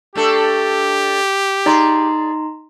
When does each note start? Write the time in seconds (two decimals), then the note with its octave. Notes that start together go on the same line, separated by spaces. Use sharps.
0.15 A3 D4 G4 A4
1.66 D#4 G#4 D5 A#5 C6